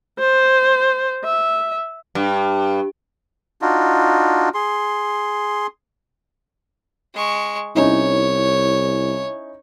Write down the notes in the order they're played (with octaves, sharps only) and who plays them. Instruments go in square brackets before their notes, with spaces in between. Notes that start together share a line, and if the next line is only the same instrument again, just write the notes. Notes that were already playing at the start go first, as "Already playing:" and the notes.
[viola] C5
E5
[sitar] G2
[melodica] D4 D#4 F4 F#4
G#4 C6
[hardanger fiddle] G#3 C#6
[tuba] C2 [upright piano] C#4 D#4 E4 [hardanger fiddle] C#5